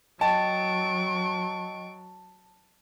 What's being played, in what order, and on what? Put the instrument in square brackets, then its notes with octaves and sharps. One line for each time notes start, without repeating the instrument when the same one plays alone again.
[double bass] F#3 [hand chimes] D#5 G5 A6 [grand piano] A5 [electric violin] C#6 D7